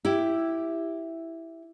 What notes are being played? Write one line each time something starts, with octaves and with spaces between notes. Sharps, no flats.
E4 G4